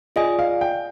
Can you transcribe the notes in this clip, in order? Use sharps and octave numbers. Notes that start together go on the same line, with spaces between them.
F4 G#4 D5 D#5 G#5
F5
G5